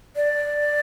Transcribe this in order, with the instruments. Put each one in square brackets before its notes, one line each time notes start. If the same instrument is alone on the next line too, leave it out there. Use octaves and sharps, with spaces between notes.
[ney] D5